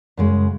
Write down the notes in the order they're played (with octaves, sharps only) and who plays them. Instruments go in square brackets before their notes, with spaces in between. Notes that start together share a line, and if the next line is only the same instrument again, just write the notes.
[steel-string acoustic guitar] F#2 C#3 G#3